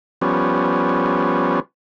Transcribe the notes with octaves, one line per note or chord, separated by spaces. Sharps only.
F3 G3 B3 C#4